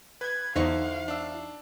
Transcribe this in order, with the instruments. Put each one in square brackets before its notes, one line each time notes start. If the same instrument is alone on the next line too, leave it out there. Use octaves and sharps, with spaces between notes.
[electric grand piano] B4 [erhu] G#6
[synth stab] E2 D#4 C#6 [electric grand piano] D3 [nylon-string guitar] E4 F#4 C5 [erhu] F5
[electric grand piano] D4 E6